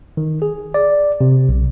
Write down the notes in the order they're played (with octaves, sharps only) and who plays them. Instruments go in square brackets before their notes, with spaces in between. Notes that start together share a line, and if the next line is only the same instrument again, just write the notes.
[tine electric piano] D#3
G#4
D5
C3
B1